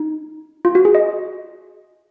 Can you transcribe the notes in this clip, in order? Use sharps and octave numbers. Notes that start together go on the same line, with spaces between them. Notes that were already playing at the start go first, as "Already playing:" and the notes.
Already playing: D#4
F4
F#4
G#4
D#5